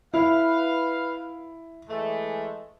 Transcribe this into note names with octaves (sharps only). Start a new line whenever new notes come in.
E4 B4 F5
E3 G#3 A3